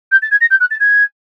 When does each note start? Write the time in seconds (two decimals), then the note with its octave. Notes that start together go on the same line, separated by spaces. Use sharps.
0.12 G6
0.22 A6
0.31 G#6
0.41 A#6
0.50 G6
0.60 F#6
0.71 A6
0.80 G#6